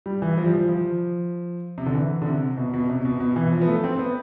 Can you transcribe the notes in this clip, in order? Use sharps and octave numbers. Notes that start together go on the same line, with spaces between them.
G3
E3
F3
G3
F3
F3
C3
D3
E3
D3
C3
B2
B2
C3
B2
B2
E3
F3
B3
A3
C4
B3